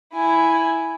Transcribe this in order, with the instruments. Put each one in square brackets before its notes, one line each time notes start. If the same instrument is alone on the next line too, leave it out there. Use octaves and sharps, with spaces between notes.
[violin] E4 G#5